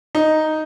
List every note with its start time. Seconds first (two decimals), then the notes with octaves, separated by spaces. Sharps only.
0.15 D#4